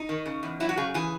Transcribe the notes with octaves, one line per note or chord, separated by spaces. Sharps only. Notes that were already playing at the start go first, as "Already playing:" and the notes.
Already playing: D#4
D#3
C#3
E2
F#3 E4
F#4
C#3 G#4
E3 G#4